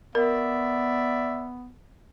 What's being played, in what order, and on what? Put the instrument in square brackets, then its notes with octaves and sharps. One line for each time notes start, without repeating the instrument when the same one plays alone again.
[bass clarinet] B3 [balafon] A#4 [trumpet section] D5 E5